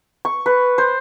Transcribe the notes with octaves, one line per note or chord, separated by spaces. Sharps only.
C#6
B4
C5